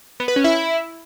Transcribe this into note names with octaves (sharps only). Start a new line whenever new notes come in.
B3
B4
C#4
E4